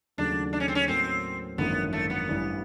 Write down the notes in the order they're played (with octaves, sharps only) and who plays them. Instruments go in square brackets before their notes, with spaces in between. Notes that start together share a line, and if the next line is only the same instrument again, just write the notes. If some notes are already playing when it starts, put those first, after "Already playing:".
[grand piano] D#2 C#3 F#3 A3 [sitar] D4
[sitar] D4
C#4
C4
C#4
[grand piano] A2 F#3 A#3 C#4 [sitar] C4
[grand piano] G#1 F#2 D3 F3 A#3 [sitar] B3
[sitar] A3
B3
[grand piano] A1 G2 E3 G3